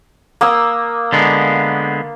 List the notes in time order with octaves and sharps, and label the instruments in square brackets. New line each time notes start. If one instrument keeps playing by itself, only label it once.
[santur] A#3 D#6 E6
[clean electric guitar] D3 G#3 B3